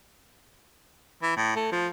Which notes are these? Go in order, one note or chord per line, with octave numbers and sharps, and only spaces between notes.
E3
A2
A3
F3